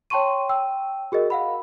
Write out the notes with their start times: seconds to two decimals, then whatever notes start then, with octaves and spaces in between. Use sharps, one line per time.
0.10 C#5 G5 A5 C6 C#6 D#7
0.49 G5 E6
1.12 F#4 G#4 A#4 D#5
1.30 F5 F#5 B5